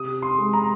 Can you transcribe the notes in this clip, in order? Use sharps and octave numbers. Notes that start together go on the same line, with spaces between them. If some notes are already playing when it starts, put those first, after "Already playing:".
Already playing: C3 D#6
C6
G#3
A#5